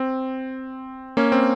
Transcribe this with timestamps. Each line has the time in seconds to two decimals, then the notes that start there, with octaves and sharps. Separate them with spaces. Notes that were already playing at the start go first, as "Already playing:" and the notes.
Already playing: C4
1.17 A#3 C#4
1.32 C4